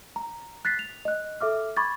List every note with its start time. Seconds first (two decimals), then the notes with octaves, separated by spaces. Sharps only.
0.16 A#5
0.65 F#6 A6 B6 C7
0.79 F7
1.05 D#5 F#6
1.41 A4 E5 D6 F6
1.77 B5 C#6 D6 G#6 A6